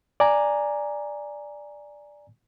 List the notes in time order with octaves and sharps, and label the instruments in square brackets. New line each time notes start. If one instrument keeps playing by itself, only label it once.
[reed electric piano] D5 G#5 A#5